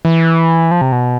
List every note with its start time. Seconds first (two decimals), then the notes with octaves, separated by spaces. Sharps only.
0.05 E3
0.71 F3
0.81 C3
0.92 B2